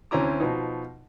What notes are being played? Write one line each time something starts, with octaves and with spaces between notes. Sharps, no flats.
D2 C4 C#4 E4 A#5 D6
B2 F3 D#4